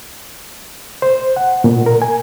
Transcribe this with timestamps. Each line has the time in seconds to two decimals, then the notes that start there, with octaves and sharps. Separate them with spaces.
1.02 C5
1.36 F#5
1.64 A#2
1.86 A#4
2.02 G#5